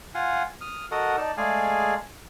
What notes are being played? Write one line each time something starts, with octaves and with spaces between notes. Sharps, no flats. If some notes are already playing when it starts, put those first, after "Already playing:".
F4 F5 F#5 G#5
D#6 F6
F#4 A4 A#4 D#5 F#5
D#4 D5 A5
G#3 A3 G#4 D5 F5 G#5